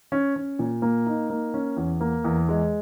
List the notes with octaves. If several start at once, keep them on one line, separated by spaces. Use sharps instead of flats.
C#4
C#4
A#2
A#3
D#4
A#3
C#4
E2
A#3
E2
G#3